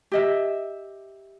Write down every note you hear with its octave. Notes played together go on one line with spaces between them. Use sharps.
G4 D#5 E5